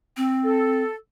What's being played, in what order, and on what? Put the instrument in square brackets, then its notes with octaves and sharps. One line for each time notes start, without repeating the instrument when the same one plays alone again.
[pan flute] C4
[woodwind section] A4